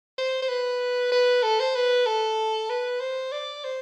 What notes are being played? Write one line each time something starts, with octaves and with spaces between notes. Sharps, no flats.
C5
C5
B4
B4
A4
C5
B4
A4
B4
C5
D5
C5